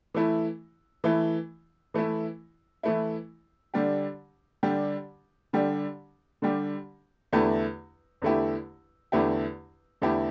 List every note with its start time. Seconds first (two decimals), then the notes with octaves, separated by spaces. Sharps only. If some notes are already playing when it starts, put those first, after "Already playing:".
0.14 E3 A3 E4
1.04 E3 A3 E4
1.94 E3 A3 E4
2.83 E3 A3 E4
3.74 D3 G3 D4 G4
4.63 D3 G3 D4 G4
5.53 D3 G3 D4 G4
6.42 D3 G3 D4 G4
7.33 E2 D3 A3 E4 G4
8.22 E2 D3 A3 E4 G4
9.12 E2 D3 A3 E4 G4
10.01 E2 D3 A3 E4 G4